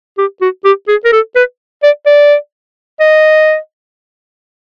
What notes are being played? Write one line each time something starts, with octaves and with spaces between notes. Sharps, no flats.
G4
F#4
G4
G#4
A#4
A4
B4
D5
D5
D#5